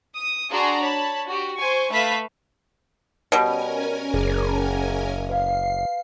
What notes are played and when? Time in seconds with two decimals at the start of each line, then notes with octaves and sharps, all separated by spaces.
0.15 D#6
0.50 D4 F#4 G#4 A5 A#5 C6
0.81 C#5 A5 B5
1.27 F#4 G4
1.58 C5 G#5 C#6
1.90 A3 B4 E5 F5 B6
3.32 B2 G3 C#4 A#4 C#5 G#5
4.14 F#1 G#4
5.30 B4 F5 C7